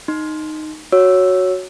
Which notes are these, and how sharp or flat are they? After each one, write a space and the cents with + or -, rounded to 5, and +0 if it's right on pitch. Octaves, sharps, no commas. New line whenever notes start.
D#4 -10 C6 +0
F#4 +0 C#5 +0 E6 +0